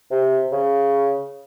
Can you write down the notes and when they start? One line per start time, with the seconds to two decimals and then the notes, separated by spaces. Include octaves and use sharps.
0.10 C3
0.52 C#3